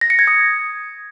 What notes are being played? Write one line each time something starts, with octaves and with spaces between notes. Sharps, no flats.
A#6
C#7
G#6
D#6